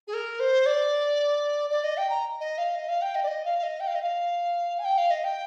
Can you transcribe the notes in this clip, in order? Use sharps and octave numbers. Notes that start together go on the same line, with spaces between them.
G#4
A#4
C5
D5
D5
D#5
G5
A#5
D#5
F5
D#5
F5
G5
D#5
D5
D#5
F5
F5
D#5
G5
F5
D#5
F5
G#5
G5
F5
D#5
G5